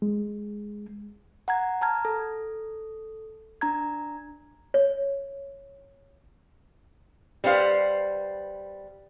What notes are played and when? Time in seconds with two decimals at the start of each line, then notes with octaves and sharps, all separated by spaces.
0.02 G#3
1.48 F#5 A#5 G#6
1.81 A5 A#5 F6 G#6
2.05 A4
3.61 D4 A#5 G#6
4.74 C#5
7.44 G3 B3 C5 F5